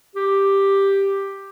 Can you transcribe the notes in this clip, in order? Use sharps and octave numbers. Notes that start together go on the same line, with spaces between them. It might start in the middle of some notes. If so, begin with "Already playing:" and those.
G4